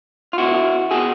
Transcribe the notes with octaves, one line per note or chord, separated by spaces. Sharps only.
F4
C#2 B2 E4 F#4
B2 F#4 G#4